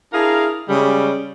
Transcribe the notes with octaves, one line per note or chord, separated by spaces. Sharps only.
D4 E4 G#4 A#4 F5 A#5
C#3 G3 G#3